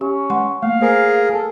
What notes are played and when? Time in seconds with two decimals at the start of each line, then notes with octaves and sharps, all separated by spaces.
0.01 C#4 G4
0.30 G#3 F#5 C6
0.63 A3 A#3 F5
0.81 G#4 A#4 C5
1.33 A4